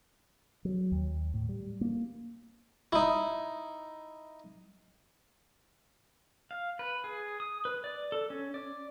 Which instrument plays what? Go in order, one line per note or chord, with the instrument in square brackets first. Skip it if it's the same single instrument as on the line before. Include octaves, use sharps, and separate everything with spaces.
[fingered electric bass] F#3
D#2
A2
G3
A#3
[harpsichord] D#4 E4
[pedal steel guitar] F5
B4
G#4
D#6
B4
D5
A4
C#4
D5